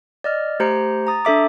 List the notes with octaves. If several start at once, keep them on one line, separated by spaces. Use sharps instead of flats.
D5 D#5 F6
A3 G4 C5 A#5 C#7
A#5 D#6 A6
D4 A4 E5 D6